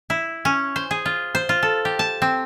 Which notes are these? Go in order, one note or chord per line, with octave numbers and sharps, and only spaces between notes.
E4
C#4
C5
G#4
F4
C5
F4
A4
G4
A5
C4